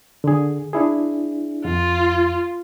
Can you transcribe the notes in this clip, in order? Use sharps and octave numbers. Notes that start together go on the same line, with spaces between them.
D3 G#4
D4 E4 G#4
F2 F4